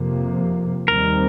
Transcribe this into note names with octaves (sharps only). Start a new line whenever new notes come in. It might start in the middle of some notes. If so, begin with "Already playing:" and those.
Already playing: F2 C3 F3 A#3
D#2 D#3 G3 C4 A#4